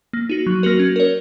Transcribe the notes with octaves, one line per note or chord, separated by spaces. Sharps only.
A#3
D#4 F#4
F#3
A#3 F#4 A#4
C#4
A#4 C#5